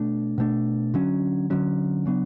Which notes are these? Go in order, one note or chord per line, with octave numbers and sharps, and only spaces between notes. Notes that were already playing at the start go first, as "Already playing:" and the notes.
Already playing: B2 A3 D4
B2 A3 D4
D3 F#3 C#4
D3 F#3 C#4
C#3 F#3 B3 D4